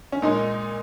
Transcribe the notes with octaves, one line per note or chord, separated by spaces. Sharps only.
C#4
A#2 G#3 D#4